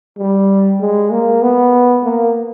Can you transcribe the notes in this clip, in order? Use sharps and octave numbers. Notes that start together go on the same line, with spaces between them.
G3
G#3
A#3
B3
A#3